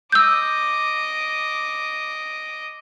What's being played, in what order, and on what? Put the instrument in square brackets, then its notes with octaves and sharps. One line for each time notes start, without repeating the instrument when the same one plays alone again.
[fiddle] D#5 D6 [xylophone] E6 G6